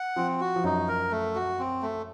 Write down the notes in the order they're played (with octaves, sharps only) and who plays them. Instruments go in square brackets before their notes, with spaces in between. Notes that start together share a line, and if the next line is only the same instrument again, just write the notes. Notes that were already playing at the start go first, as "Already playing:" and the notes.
Already playing: [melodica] F#5
[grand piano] F3 [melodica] C4
[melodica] F#4
[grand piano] F3
[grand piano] F#2 F#3 [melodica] D#4
[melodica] A#4
A3
F#4
C4
A3